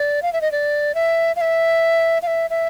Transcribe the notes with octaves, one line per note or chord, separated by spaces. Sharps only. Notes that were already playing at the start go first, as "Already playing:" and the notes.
Already playing: D5
F5
E5
D#5
D5
E5
F5
E5
F5
E5
E5